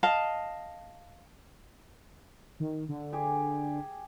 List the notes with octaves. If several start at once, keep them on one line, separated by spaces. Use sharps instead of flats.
D#5 F5 A5
D#3
D3
G4 G#4